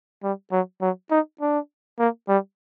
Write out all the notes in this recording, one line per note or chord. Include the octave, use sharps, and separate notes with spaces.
G3
F#3
F#3
D#4
D4
A#3
G3